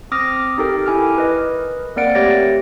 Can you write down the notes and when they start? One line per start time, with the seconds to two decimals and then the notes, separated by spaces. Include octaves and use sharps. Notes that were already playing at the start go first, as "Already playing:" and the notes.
0.11 C4 D6 D#6 F6 A#6
0.58 D#4 G4 A4 A#4 G5
0.86 E4 G#5 D6 F6
1.16 A#4 B4 D#5
1.96 A#3 C4 A#4 D5 F#5 D7
2.15 A3 G4 C#5 A6 A#6